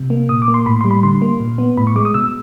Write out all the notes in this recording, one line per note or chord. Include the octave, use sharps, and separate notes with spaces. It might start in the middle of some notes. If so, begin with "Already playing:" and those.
Already playing: C3
A#3
A#2 D#6
D6
A#3
C6
A2 B5
G3 C6
B5
D3 C6
A#3
A#2
B3
A2 B5
C#6
G#3 D6
D#6
B2 E6